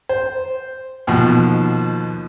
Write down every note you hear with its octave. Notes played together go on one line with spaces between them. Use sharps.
C5
D#2 B2 F3